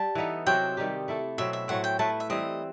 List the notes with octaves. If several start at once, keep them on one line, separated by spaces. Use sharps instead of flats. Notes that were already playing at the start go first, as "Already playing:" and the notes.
Already playing: G3 A5
E3 B3 D#4 A4
C3 F#3 C4 F#4 G5
D#3 G3 D#4 G4
A3 E4 A4
B2 F#3 C4 E5
E5
A2 F#3 A3 C4 F#5
G5
A3 E4 B4 A5
E5
E3 G3 C4 D#5